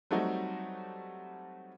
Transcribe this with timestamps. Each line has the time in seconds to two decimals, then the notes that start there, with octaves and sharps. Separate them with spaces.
0.11 F#3 G3 A3 C4 D#4 F#4